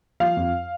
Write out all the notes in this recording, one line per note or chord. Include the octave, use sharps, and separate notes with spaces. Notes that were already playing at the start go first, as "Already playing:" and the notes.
F3 F5
F2